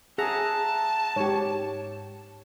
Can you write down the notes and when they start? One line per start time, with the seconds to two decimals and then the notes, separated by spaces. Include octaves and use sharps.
0.18 G#4 E5 F#5 A5 A#5
1.16 G#2 G4 C#5